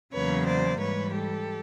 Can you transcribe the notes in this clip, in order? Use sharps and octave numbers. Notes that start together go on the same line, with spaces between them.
E2 C#3 F#3 A#3 B4 C#5
C5 D5
G#2 E3 G3 B4 C#5
G4 A4